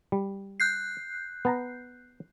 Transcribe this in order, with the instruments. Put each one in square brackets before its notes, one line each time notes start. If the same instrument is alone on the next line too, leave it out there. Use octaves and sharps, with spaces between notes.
[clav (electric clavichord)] G3
[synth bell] F#6 G6 C7
[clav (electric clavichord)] B3 A5 A#5